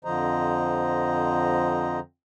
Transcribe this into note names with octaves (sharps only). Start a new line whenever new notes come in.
F2 D3 F3 C5 D#5 A#5